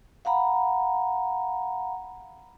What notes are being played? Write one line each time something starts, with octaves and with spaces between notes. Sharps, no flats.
F5 F#5 A#5 B5